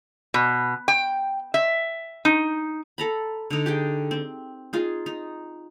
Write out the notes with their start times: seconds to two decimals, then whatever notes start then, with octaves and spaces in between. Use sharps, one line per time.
0.34 B2
0.88 G5
1.54 E5
2.25 D#4
2.98 A4 A#5 B5
3.50 D3 D#4
3.66 G4 G#4 G5
4.11 C4
4.73 D#4 F4 G#4
5.06 D#4